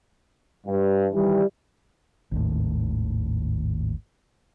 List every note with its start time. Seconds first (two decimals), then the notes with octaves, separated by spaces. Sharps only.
0.66 G2
1.12 D#3 E3 G3
2.32 G#1 D#2 A2